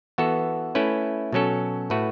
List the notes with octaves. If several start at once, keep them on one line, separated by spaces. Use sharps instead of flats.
E3 B3 F#4 A4
A3 C#4 E4 B4
B2 F#3 C#4 A4
A2 A3 F#4 B4